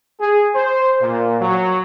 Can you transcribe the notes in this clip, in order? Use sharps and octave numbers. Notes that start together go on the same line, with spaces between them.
G#4
C5
A#2
F#3